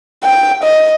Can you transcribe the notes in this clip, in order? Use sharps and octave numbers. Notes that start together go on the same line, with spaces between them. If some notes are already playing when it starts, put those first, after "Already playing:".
G5
D#5